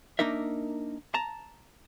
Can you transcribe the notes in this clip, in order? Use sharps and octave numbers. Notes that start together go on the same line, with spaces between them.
A#3 D4 D#4 A#4 E5
A5 A#5